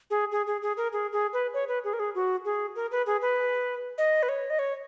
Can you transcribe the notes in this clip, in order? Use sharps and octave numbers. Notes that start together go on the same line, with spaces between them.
G#4
G#4
G#4
G#4
A#4
G#4
G#4
B4
C#5
B4
G#4
A#4
G#4
F#4
G#4
A#4
B4
G#4
B4
D#5
B4
C#5
D#5
C#5